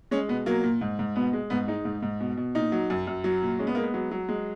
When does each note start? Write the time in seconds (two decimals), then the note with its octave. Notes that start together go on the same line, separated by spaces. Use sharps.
0.11 G#3 C#4
0.28 B2 B3
0.46 F#3 A#3
0.64 A#2
0.81 G#2
0.99 G#2
1.16 B2 B3
1.33 G#3
1.50 G#2 B3
1.68 G#3 D#4
1.85 G#2
2.02 G#2
2.20 B2
2.37 B2
2.55 A#2 D#4
2.72 F#3
2.90 F#2
3.07 F#2
3.24 F#3
3.42 A#2
3.59 G#3 C#4
3.67 B3
3.75 G#3 A#3
3.83 B3
3.94 F#3
4.11 F#3
4.29 G#3